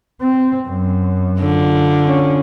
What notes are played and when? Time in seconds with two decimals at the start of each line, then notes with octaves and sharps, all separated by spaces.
0.21 C4
0.68 F#2
1.40 D3 F4
2.05 C#4